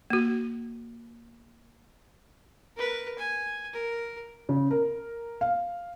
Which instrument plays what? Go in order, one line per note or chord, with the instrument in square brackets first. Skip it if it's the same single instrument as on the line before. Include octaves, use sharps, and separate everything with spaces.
[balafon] A#3 F#4
[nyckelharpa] A#4 B4
G#5
A#4
[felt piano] C#3
A#4
F5